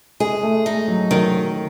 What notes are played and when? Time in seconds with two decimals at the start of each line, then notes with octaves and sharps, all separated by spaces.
0.20 G#3 G#4
0.43 A3
0.66 A3 D#4
0.88 F#3
1.11 D#3 F#3